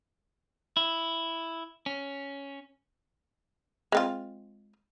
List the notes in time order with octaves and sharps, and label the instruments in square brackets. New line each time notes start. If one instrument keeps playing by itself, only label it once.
[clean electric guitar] E4
C#4
[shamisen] G#3 C4 F4